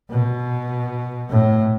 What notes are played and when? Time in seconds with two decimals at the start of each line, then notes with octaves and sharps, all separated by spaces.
0.11 B2
1.30 A2